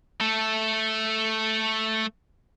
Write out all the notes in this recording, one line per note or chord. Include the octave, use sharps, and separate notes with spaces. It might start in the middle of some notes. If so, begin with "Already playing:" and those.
A3 A4